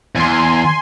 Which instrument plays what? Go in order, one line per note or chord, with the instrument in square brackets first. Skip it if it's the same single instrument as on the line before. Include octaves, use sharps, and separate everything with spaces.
[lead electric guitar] E2 [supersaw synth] G#5 C6